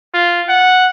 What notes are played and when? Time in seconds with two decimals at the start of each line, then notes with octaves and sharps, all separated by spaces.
0.14 F4
0.49 F#5